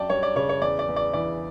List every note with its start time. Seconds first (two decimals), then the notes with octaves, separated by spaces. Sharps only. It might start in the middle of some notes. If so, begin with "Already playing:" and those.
Already playing: F#2 D5 G5 A5
0.10 G3 C#5
0.23 D5
0.36 C#3 C#5
0.49 C#5
0.62 E2 D5
0.79 D5
0.88 E2
0.96 D5
1.13 E3 D5